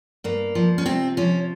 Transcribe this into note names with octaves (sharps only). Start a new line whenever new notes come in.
G2 A#3
F3
C#4
C3 C4
F3 C#4